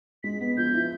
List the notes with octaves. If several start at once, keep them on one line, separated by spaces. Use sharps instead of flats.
G#3 B6
B3
F3 G6
E4